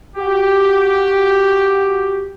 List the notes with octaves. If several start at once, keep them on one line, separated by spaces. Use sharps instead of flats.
F#4 G4